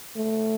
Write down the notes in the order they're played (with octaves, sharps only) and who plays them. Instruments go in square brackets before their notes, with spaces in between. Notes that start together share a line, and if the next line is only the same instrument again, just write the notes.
[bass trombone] A3